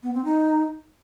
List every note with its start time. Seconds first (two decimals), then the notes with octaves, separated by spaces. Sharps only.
0.03 B3
0.14 C4
0.25 D#4